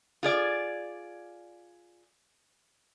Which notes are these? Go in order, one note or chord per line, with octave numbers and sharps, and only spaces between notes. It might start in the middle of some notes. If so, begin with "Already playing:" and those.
F4 G#4 D5